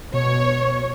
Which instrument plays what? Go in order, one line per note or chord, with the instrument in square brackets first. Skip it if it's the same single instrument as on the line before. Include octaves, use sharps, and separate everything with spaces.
[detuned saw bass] B2 [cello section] C#5